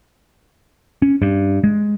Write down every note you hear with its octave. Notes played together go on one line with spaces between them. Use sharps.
C#4
G2
G#3